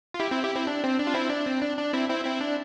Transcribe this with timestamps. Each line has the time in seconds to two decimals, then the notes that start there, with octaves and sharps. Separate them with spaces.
0.14 F4
0.20 E4 G4
0.31 C4 E4
0.43 E4 G4
0.55 C4 E4
0.67 D4
0.83 C4
0.99 D4
1.07 F4
1.14 C4 E4
1.30 D4
1.46 C4
1.62 D4
1.77 D4
1.93 C4 E4
2.09 C4 E4
2.25 C4 E4
2.41 D4